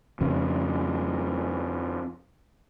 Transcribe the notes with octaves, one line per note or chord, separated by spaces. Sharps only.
F2 C#3